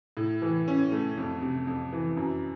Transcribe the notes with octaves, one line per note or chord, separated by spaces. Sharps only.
A2
E3
C#4
A3
F2
C3
F2
E3
F#2